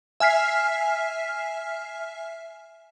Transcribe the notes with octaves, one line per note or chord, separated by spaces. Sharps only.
E5 G#5 F6 B6 C7